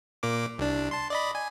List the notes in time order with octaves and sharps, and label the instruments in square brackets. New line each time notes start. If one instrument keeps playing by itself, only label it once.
[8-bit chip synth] A#2 A#3 D6
C2 D4
A5 C6
D5 D#5 B5
G#5